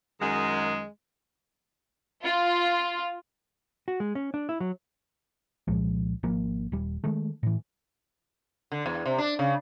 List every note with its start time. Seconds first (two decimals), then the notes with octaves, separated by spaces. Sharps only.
0.21 F#2 D#3 G#3
2.23 F4
3.88 F#4
4.00 G#3
4.15 C#4
4.34 D4
4.49 E4
4.60 F#3
5.68 C2 A#2 F3 G#3
6.23 G#1 F3 A#3
6.72 D#1 G3
7.04 D#3 G#3 A3
7.43 A2 E3
8.72 D3
8.86 E2
9.06 C3
9.18 D4
9.39 C#3